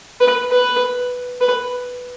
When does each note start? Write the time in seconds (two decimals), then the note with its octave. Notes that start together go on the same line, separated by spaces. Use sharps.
0.20 B4
0.51 B4
1.41 B4